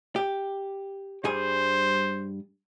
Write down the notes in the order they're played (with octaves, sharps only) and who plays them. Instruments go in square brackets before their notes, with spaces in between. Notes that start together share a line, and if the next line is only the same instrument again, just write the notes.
[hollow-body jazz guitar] G4
[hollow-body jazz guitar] G2 G3 G#4 [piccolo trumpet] C5